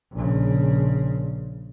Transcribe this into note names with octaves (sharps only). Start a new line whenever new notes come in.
A#1 C#3